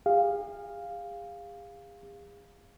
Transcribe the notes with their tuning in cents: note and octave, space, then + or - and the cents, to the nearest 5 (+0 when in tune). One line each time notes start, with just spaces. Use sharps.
G#4 -40 F5 +0